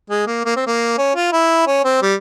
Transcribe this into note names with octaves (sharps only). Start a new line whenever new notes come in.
G#3
A#3
A#3
C4
A#3
C#4
F4
E4
C#4
C4
G3